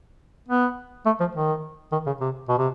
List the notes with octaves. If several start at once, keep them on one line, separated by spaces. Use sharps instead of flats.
B3
A3
F3
D#3
D#3
C#3
C3
B2
C3